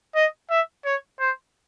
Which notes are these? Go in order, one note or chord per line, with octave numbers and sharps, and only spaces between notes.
D#5
E5
C#5
C5